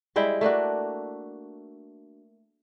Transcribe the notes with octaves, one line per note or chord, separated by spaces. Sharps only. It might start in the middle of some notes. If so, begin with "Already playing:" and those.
G3 G#3 E4 G5
A3 A#3 D4 F#4